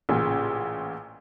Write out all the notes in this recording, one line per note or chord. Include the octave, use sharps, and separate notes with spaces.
A1 A#2 C#3